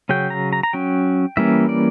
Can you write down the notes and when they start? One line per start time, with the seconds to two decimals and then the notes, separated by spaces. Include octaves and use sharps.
0.09 C#3 F#3 C#4 G5
0.30 A#5
0.53 A#5
0.63 A#5
0.73 F#3 C#4 G5
1.37 E3 G3 A#3 C#4 E5
1.69 D5